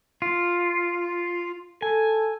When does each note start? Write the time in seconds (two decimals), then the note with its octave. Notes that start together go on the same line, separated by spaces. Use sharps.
0.22 F4
1.82 A4 G#5